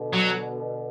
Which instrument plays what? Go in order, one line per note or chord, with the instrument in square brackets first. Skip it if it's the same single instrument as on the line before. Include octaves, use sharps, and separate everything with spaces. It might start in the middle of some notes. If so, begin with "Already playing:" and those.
Already playing: [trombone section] B2 D3
[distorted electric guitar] F#3